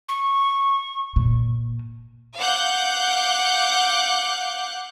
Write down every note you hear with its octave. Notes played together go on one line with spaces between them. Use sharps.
C#6
A#2
F5 F#5 D6 F#6 G6